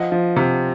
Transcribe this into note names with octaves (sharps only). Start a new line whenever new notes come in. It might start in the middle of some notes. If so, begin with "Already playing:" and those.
Already playing: F3 D#5 F#5
F3
C3